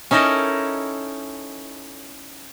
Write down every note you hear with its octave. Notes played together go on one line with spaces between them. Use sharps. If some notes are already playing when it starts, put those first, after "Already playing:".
C#4 D#4 E4 A4 A#4 D#5